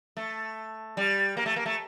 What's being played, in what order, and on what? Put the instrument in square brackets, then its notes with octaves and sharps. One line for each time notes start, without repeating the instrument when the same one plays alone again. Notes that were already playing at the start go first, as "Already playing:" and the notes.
[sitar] A3
G3
A#3
A3
A#3
A3